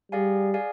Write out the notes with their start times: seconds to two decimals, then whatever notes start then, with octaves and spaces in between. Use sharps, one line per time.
0.12 G3 G#4 D5 F5 G#5
0.54 G#4 D5 F5 G#5